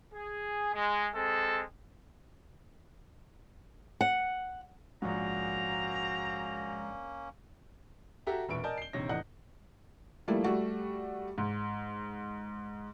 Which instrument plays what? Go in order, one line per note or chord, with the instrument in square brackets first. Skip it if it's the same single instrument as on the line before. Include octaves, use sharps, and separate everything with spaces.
[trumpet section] G#4
G#3
G#3 C4 A4
[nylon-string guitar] F#5
[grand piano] A#1 G#2 [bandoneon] A#3 C#4 [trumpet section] C4 A#5 [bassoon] F#4
[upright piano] F#4 G4 A4 E5 A#5
E1 A#2 B4 E5 C#6 D7
A#4 D5 D#5 G#5 A5 G6
C7 G7
A#1 D#2 C3 C#5 A#6
E2 A2 D4 D#5 F#5 F#6
[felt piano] F3 G3 A3 A#3 E4
G3 A3 F#4
G#2